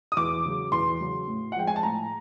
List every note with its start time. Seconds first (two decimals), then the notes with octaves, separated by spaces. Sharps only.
0.12 D#6
0.17 E2 D6
0.45 C#3 F#3
0.72 E2 C6
1.01 C#3 F#3
1.28 A2
1.52 F#5
1.56 F3 G#3 G5
1.67 G#5
1.76 A5
1.83 A2 A#5